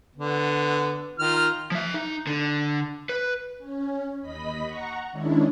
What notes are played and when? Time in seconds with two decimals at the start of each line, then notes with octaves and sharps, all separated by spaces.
0.16 D3 B3
1.19 D#3 F4 F6
1.71 F3 E5
1.94 D#4
2.27 D3
3.09 B4
3.59 C#4
4.22 D#2 D#5 B5 B6
4.64 F#5 A#5 C#6
5.12 D#3 G#3 C#4 D4 E4